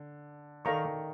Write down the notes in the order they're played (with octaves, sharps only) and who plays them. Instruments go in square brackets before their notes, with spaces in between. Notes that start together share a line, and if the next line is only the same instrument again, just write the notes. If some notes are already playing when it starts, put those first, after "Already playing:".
Already playing: [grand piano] D3
[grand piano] D#3 [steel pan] A4 D5 F5 A#5 C#6
[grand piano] D#3